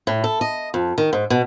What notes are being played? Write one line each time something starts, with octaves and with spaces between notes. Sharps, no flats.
A2
A4
D#5
F2
D#3
G#2
B2